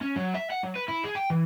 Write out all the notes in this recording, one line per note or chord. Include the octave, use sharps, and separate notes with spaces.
C#4
F#3
E5
F#5
F#3
B4
E4
G#4
G5
E3